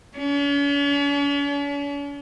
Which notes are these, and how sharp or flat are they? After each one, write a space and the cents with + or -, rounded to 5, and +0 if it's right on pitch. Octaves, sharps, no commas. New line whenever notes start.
C#4 +45